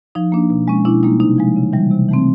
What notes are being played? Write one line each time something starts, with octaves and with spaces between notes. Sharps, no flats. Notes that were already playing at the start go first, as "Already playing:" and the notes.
F3 D#4
A#3 D4
B2
G#3 C#4
B2 D4 E4
G3 A#3 D#4
C3 D#4
F3 G#3
C#3
E3 G3
C3
E3 A3 C4